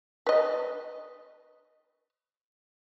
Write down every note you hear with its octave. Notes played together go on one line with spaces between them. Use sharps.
B4 D#5